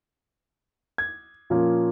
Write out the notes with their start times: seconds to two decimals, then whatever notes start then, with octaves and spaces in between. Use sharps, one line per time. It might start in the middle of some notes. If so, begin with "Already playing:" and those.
0.98 G#6
1.50 A#2 F3 A#3 C#4